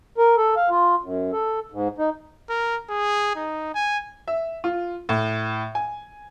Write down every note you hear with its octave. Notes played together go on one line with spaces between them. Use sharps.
A#4
A4
F5
F4
F#2
A4
G#2
D#4
A#4
G#4
D#4
G#5
E5
F4
A2
G#5